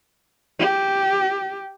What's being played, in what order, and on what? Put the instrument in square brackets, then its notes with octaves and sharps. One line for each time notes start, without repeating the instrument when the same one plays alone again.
[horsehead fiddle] G4